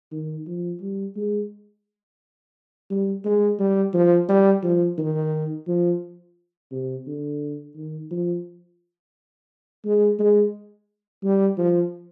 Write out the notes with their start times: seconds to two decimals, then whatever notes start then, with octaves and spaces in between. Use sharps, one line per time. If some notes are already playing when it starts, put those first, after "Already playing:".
0.12 D#3
0.47 F3
0.81 G3
1.16 G#3
2.90 G3
3.25 G#3
3.59 G3
3.94 F3
4.29 G3
4.63 F3
4.98 D#3
5.67 F3
6.72 C3
7.07 D3
7.76 D#3
8.11 F3
9.85 G#3
10.19 G#3
11.23 G3
11.58 F3